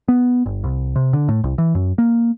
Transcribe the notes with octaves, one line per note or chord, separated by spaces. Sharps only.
B3
G1
C2
C3
D3
A2
C2
E3
F#2
A#3